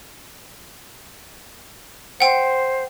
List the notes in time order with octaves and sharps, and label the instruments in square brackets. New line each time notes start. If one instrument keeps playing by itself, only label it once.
[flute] C5 [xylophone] F#5 G5